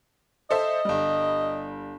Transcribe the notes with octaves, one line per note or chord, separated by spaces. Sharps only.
A4 C5 D#5 E5
G1 G3